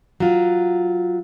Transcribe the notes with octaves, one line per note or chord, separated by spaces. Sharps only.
F#3 F4